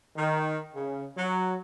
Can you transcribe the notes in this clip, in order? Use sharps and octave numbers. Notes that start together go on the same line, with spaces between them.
D#3
C#3
F#3